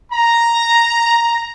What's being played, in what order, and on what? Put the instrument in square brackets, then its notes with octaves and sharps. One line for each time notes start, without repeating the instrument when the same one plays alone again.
[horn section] A#5